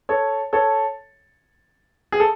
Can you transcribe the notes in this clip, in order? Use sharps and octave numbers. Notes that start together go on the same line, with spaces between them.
A4 C#5
A4 C#5
G#4
A4